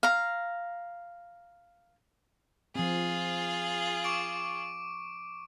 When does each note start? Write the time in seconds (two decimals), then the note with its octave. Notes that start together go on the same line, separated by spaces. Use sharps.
0.03 F5 A#5
2.75 F3 C4 F4 G#4
4.04 C#6 D6 D7